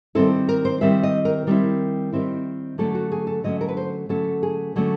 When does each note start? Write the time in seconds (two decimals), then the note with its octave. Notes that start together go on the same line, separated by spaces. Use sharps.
0.15 D#3 G3 C4 E4 A4
0.49 A#4
0.65 C5
0.81 D#3 G3 C4 E4 E5
1.03 D#5
1.25 A#4
1.47 D#3 G3 C4 E4
2.12 D#3 G3 C4 E4
2.78 D3 F#3 A3 C#4 A4
2.95 F#4
3.12 G#4
3.27 A4
3.44 D3 F#3 A3 C#4 D#5
3.61 A#4
3.68 B4
3.77 C5
4.09 D3 F#3 A3 C#4 A4
4.43 G#4
4.76 D3 F#3 A3 C#4